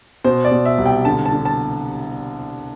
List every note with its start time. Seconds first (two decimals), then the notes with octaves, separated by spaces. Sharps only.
0.24 B2 C5
0.44 D5
0.51 B2
0.66 E5
0.78 C2
0.86 G5
1.05 D3 A5
1.26 A5
1.32 D3
1.45 A5